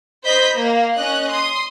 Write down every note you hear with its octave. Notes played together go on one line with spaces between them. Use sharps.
C5 D#5 B5 G6 B6
A#3
C#4 D#5 F#6
C6 D#6